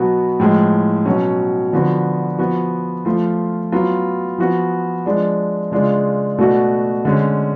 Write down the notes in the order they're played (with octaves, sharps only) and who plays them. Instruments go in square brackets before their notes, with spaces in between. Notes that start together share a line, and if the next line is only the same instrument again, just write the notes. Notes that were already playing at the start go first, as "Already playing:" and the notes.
Already playing: [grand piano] B2 F#3 B3 F#4
A2 F3 G#3
B2 F#3 C#4
D3 F3 B3 F#4
F3 B3 F#4
F3 A3 F4
F#3 B3 F4
F3 B3 F#4
F3 G#3 D4
C#3 G#3 D4 F4
B2 A3 D4 F#4
D3 G#3 C#4